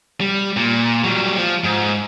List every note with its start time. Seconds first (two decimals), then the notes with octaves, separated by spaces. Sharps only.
0.21 G3
0.56 A#2
1.04 F#3 G3
1.37 F3
1.64 G#2